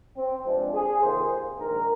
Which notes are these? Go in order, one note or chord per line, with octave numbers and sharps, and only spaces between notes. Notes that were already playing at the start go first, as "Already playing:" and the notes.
C4
G2 F3 G#3 C4 D4
G#4
F2 C3 D#3 A#3 C5
A#1 G#2 D#3 A#4